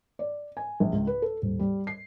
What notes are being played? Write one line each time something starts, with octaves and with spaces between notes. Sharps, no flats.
D5
G#5
A#1
C#2
B4
A4
D#1
G3
C7